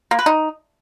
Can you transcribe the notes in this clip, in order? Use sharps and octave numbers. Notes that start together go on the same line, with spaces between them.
A#3
B4
D#4